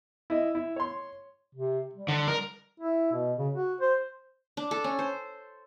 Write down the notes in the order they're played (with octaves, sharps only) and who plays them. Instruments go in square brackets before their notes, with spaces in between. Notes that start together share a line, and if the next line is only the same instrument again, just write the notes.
[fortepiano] E4 D#5
E4
C#5 C6
[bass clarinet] C3
G3
[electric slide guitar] D3
A#4
[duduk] E4
B2
C#3
F#4
C5
[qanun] D4
A4
C#4
C5